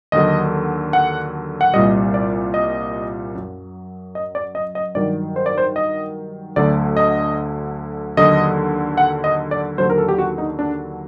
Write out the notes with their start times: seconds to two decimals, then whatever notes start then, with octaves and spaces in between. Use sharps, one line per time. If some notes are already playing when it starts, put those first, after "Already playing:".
0.12 D#2 D3 F#3 D#5
0.93 F#5
1.61 F#5
1.73 C2 A#2 G3 D#5
2.14 D5
2.54 D#5
3.35 F#2 F#3
4.15 D#5
4.35 D5
4.55 D#5
4.75 D#5
4.95 G2 D#3 F#3 D5
5.36 C5
5.46 D5
5.58 C5
5.76 D#5
6.56 D2 D3 F#3 D5
6.97 D#5
8.17 D#2 D3 F#3 D#5
8.98 F#5
9.24 D#5
9.51 D5
9.78 D#2 D3 F#3 C5
9.90 A#4
9.98 A4
10.08 G4
10.18 F#4
10.38 D#4
10.59 D4